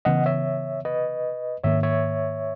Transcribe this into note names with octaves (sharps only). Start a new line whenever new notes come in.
C#3 E3 B3 D#5 F#5
C#5 E5
B4 D#5
G#2 D#3 A#3 C#5 E5
C#5 E5